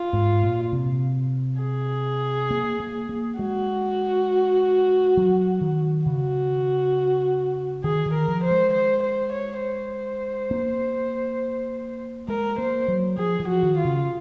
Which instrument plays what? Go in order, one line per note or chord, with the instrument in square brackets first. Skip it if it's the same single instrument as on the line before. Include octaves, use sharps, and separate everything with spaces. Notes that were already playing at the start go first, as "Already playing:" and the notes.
Already playing: [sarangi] F4
[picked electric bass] G#2
A#2
C3
[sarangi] G#4
[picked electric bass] A#3
A#3
A#3
[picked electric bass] G#3 [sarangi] F#4
[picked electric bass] F#3
D#3
[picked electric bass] C#3 [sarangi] F#4
[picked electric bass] D#3 [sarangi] G#4
[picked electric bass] D#3
[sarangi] A#4
[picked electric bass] F3
[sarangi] C5
[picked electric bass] G#3
[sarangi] C5
C5
C#5
C5
[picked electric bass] A#3
[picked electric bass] G#3 [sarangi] A#4
[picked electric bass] A#3 [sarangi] C5
[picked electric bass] F#3
[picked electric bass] F3 [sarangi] G#4
[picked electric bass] F3
[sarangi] F#4
[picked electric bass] D#3
[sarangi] F4
[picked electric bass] C#3